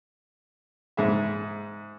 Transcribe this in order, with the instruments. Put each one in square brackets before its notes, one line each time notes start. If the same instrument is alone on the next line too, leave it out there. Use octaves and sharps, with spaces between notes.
[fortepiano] G#2 G#4 E5